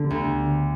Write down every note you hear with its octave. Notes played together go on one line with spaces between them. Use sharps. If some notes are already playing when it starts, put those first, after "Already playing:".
Already playing: D3 B3 D4 G4 A4
D2